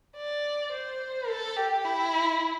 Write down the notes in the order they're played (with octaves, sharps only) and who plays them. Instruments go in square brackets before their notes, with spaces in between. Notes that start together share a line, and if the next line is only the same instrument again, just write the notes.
[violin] D5
C5
A4
G4
E4